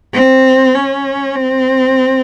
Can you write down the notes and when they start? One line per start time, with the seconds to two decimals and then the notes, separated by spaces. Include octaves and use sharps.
0.14 C4
0.75 C#4
1.35 C4